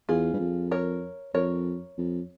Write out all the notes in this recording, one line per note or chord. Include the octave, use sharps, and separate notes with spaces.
E2 F4 G#4
G2
F2
A#4 C#5
F2 A#4 C#5
F2